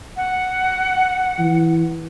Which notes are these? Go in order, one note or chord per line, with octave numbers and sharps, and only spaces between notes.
F#5
E3